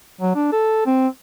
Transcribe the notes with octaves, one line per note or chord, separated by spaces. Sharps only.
F#3
D4
A4
C4